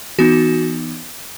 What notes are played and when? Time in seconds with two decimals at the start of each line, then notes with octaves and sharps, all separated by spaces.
0.19 E3 B3 D#4 F#4